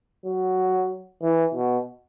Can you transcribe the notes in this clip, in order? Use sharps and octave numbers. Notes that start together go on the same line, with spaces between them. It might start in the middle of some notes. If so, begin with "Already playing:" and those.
F#3
E3
B2